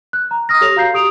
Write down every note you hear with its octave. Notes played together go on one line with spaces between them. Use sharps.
F#6
A#5
D#6 F6 A#6
G4 A4 C#5 A#6 F7
F#4 F5 A#5 G6 C7
G4 D#6 D7 F7